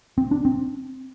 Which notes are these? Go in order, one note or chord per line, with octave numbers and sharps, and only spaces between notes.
C4
D4
C4